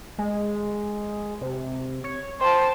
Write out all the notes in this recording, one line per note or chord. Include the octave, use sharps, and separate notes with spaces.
G#3
C3
C#5
C5 G5 A5